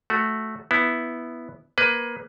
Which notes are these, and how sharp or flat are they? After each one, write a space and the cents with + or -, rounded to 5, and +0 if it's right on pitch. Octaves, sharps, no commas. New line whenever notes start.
A3 -5 F#4 -5
B3 +0 E4 +0
A#3 +25 B4 +20